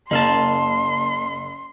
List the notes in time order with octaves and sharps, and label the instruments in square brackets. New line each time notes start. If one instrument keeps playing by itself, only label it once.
[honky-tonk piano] F#1 [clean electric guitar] A#3 F5 A5 [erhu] C6